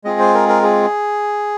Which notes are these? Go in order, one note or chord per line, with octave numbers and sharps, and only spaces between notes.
G#3 C4 F4 G#4 D#5
C5
A#4
A#4
G#4